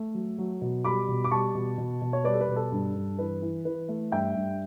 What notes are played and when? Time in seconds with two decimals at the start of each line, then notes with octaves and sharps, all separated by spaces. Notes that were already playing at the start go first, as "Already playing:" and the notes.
Already playing: A3
0.14 F#3
0.38 F#3
0.62 B2
0.84 G3 B5 D6
1.08 B2
1.24 D6
1.31 G3 A5 C#6
1.55 B2
1.78 B2
2.02 B2
2.13 C#5
2.24 G3 B4 D5
2.33 A4
2.41 B4
2.48 B2
2.56 A4
2.72 G2
2.95 G2
3.19 E3 B4
3.42 E3
3.65 E3 B4
3.89 A3
4.12 G2 E5 G5
4.35 G2